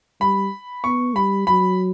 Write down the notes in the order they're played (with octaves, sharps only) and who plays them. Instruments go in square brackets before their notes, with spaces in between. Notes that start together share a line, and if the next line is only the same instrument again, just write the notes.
[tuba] G3 [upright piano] B5
[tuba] B3 [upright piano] C#6
[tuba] G3 [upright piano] B5
[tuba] F#3 [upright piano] B5